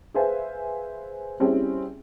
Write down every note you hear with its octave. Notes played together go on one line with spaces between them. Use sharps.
G#4 B4 C5 E5 F5 G#5
G3 C4 C#4 E4 G#4